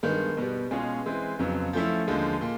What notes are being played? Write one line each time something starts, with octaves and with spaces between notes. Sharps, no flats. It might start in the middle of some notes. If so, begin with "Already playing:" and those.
G2 D#3 G#3 B3
B2 G3 B3
B2 G#3 C#4 F4 G#4
E3 G#3 C4
F2 C#3 F#3 B3
F3 A3 C#4 E4
D#2 D3 F3 G#3
A#2